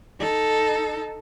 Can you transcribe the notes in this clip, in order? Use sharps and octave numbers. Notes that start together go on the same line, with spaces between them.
D#4 A4